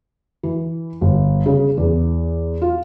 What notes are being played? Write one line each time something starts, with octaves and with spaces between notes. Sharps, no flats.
E3
G1
C#3
E2
F4